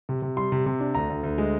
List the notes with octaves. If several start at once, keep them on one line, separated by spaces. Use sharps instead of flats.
C3
C3
G3 C6
C3
C3
D4
D2 A#5
D2
D2
G#3